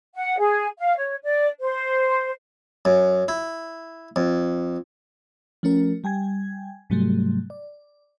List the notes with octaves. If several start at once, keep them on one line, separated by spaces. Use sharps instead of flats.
F#5
G#4
F5
C#5
D5
C5
F#2
E4
F2
F3 A3 C#4 A#4
G3 G5 G#5 G#6
G#2 C3 F#3 G3 A3
D5